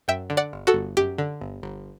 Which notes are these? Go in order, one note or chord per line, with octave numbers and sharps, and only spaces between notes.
F#2 E5 G5
D3
D5 F#5
G1
F#4 A4
G1
F#2 G4
D3
G1
G1